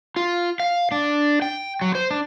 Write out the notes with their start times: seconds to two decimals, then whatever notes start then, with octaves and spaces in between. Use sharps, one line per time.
0.16 F4
0.60 F5
0.92 D4
1.42 G5
1.81 F#3
1.95 C5
2.11 D4